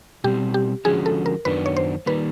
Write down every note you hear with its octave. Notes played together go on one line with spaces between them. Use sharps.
B2 G3 C4 G4
G4
D3 F3 G#3 C#4 F#4 G#4
A4
A#4
F#2 D#3 F#3 B3 D4 B4
C#5
C5
D#3 G3 A#3 B4